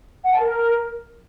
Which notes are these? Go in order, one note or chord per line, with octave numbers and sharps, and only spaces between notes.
F#5
A5
A#4